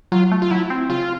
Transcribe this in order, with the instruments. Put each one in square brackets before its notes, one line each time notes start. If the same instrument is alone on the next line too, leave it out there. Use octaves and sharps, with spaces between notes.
[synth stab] F#3 [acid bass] F4
[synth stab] A3
[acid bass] F4
[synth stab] F#3 [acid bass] E4
[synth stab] C4
[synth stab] C#3 [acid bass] F4